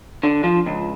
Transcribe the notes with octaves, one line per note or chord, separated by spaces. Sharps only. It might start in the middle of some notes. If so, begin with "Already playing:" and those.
D3
F3
C#2